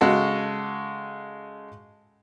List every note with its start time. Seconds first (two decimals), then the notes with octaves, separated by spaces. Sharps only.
0.01 C#3 G#3 F#4 A4